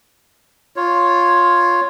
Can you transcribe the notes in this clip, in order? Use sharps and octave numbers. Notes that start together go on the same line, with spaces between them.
F4 C#5